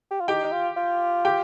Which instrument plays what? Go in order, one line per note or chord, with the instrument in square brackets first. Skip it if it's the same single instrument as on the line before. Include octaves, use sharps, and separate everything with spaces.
[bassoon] G4
F4
[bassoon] D#4 [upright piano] G4 G5
[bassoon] D#4
F4
F4
[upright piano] G4 G5